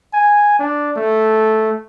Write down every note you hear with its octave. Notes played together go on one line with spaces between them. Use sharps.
G#5
D4
A3